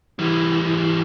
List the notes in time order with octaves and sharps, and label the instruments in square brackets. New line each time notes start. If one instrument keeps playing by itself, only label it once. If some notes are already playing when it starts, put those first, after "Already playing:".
[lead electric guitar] E3 G3